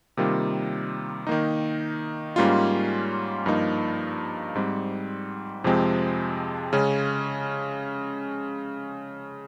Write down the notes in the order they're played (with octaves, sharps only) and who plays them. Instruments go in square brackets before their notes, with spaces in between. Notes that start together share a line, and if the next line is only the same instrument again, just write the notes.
[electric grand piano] C3 D#3 G3 A#3 F4
D#3 A#3 D#4
G#2 G3 A#3 C#4 F4
G2 F3 A#3 D#4
G#2 G3 C4
F2 C3 F3 G#3 C4
C#3 G#3 C#4